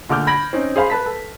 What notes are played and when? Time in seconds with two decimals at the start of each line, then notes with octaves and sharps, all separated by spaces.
0.09 A#2 D3 A3 D6 F6 G6
0.27 B5 G#6 A#6 D7 F#7
0.53 C4 C#4 D#4
0.76 G#4 C5 F5 B5 C6
0.90 B4 A5 B6
1.06 A4